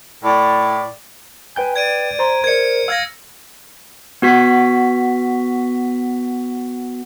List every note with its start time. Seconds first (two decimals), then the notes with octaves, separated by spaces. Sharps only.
0.23 A2 E4 D5
1.56 B4 G5 G#5 G6
1.76 D5 G#6 D7 D#7
2.19 C5 A#5 C6
2.44 A#4 C5 D5 G#6 C#7
2.88 F5 E6 F6 G#6 A#6
4.22 B3 F#4 B6